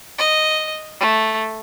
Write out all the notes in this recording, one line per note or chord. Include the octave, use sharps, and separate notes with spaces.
D#5
A3